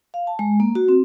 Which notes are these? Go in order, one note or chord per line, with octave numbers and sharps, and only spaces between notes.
F5
A5
G#3
A#3
F#4
C4